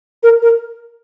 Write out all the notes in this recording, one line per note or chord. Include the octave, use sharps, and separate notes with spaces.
A#4
A#4